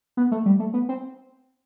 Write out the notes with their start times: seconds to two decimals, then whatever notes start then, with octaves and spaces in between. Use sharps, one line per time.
0.17 B3
0.32 A3
0.46 G3
0.60 A3
0.74 B3
0.89 C4